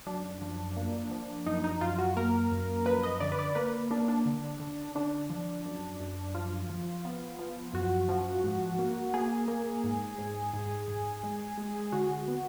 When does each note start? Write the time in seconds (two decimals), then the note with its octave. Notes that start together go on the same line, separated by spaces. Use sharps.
0.06 F#2 D4
0.42 F3
0.76 A#3
1.11 F3
1.46 F#2 D#4
1.64 D#4
1.81 F#2 F4
1.98 F#4
2.16 A#3 A#4
2.51 F#2
2.86 F3 B4
3.03 D#5
3.20 D3 D5
3.32 B4
3.39 D5
3.55 A#3 B4
3.91 A#3 D4
4.08 D4
4.26 D3
4.60 D3
4.95 D3 D4
5.30 F3
5.65 F#2
6.00 F#2
6.35 F3 F4
6.70 F3
7.05 B3
7.39 F3
7.73 F#2 F#4
8.09 F3
8.44 G#2
8.79 A#3
9.14 A#3 G#4
9.48 A#3
9.84 G#2
10.18 G#2
10.53 G#2
10.88 G#2
11.23 G#3
11.58 G#3
11.92 D3 F#4
12.28 B3